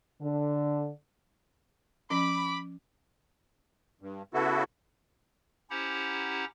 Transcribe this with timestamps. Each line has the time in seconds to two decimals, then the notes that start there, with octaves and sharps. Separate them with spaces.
0.22 D3
2.10 F3 C#4 B5 D6
4.01 G2
4.34 C#3 B3 E4 F#4 A4
5.70 C#4 E4 G4 C5 F#5 A#5